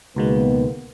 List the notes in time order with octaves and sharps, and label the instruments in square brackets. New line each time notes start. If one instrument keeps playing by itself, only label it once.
[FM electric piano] C#2 B2 G#3 [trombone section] D#3 A#3 B3